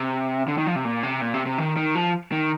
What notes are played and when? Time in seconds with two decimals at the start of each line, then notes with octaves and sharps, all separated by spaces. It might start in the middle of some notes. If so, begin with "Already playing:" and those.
Already playing: C3
0.48 D3
0.58 D#3
0.67 F3
0.75 C3
0.85 A#2
1.03 C3
1.21 A#2
1.34 C3
1.46 C3
1.58 D#3
1.77 D#3
1.95 F3
2.32 D#3